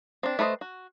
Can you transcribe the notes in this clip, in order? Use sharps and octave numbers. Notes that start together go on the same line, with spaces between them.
C4 D4
A3 B4 C5 D5 D#5
F#4